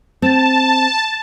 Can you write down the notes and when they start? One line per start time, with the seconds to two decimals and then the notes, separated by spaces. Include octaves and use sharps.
0.22 C4 A5